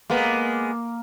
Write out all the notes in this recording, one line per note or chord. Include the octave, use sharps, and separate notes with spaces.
G#3 A#3 B3